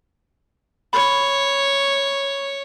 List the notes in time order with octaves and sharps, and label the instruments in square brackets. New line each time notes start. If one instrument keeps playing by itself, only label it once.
[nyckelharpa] C#5 [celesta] B5